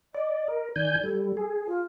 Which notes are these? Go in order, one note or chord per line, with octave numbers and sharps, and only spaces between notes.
D5 D#5
A#4
D#3 D5 G#5 G6
G3 A4
G#4
F4